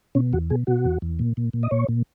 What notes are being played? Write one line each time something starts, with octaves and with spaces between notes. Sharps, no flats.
B2 C#4
E2 F#4
B2 G#4
B2 F#4
E2
E2
A#2
A#2
A#2
D#5
A#2 C#5
A#2